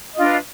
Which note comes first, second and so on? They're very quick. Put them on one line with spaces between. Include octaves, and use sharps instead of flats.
D#5 F4 D4 B4